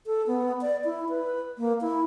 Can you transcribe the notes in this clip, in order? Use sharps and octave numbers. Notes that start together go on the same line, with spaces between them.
A4
B3
D5
E4
B4
A#3
E4